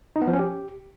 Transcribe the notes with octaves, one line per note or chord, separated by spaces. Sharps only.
D#4
B3
F3
C#4
G4